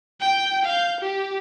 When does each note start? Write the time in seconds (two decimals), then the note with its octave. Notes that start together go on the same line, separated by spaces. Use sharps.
0.21 G5
0.65 F5 G6
1.00 G4